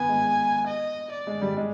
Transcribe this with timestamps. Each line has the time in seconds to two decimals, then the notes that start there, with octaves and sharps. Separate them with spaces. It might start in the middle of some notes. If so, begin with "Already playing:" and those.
Already playing: B3 G#5
0.09 G#3
0.67 D#5
1.13 D5
1.27 G#3
1.41 G3
1.57 G#3